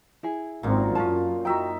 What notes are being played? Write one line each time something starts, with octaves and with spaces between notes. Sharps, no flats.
E4 G#4
G#1 F#2 A#2 C4
F#2 C#4 D4 F4 A5
D#4 F#4 E5 G5